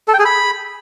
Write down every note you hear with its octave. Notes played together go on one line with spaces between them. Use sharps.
A4
G5
G#4
B5